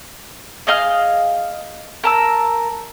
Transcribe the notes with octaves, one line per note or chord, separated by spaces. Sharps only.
G#4 D#5 F5 F6
A#4 A5 E6